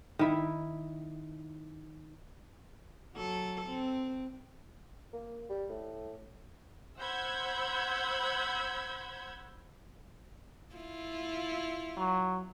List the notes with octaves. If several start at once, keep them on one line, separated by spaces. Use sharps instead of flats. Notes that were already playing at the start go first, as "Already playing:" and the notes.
D#3 E4
F#3 A4
C4
A#3
G3
A2
C5 F#5 B5 E6 G6 G#6
E4 F4
F#3